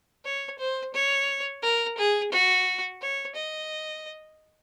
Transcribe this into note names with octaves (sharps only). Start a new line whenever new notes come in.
C#5
C5
C#5
A#4
G#4
F#4
C#5
D#5